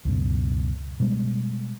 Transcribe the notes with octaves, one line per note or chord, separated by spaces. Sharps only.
C#2 F#2 B2
B2 G3 G#3